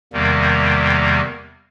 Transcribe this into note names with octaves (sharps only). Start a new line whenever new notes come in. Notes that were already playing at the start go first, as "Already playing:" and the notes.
E2 C3 D#3 G3 A#3